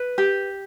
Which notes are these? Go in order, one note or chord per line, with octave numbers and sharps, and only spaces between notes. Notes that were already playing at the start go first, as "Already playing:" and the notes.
Already playing: B4
G4